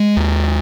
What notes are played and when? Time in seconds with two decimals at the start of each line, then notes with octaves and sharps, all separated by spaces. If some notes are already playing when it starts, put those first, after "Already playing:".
Already playing: G#3
0.17 D#2